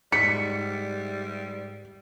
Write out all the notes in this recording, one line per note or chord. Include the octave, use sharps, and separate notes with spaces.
G#2 G3 B6 C#7